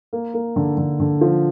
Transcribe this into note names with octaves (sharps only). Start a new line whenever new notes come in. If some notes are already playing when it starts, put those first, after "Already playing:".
A#3
A#3
D3
D3
D3
F3